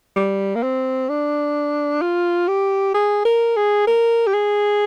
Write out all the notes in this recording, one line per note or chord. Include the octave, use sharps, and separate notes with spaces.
G3
A#3
C4
D4
F4
G4
G#4
A#4
G#4
A#4
G4
G#4